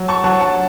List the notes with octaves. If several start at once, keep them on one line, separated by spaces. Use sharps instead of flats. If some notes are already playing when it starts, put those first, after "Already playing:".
Already playing: F#3
A5 C#6
F#3 F#5 A5
F#5 A5